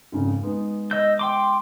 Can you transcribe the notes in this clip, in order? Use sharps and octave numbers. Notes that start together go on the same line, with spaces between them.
G#1 F2 C#3
G#3 B3 D#4
D#5 E6 G6
G5 C6 D6